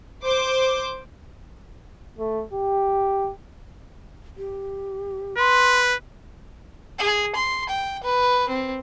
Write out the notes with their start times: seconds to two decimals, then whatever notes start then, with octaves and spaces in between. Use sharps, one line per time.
0.23 C5 D6
2.18 A3
2.53 G4
4.37 G4
5.38 B4 C6
6.99 G#4
7.35 C6
7.69 G5
8.03 B4
8.49 C4